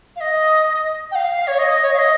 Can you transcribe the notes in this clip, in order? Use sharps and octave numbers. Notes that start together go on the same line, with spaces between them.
F5
D#5
G5
F5
C#5
D#5
D#5
C#5
F5
D#5